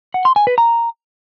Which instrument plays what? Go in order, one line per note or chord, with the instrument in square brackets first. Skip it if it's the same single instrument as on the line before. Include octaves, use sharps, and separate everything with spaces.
[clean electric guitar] F#5
C6
G#5
B4
A#5